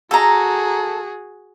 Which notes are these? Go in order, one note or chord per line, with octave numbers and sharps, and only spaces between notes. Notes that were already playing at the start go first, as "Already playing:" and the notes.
F#4 G#4 A4 A#5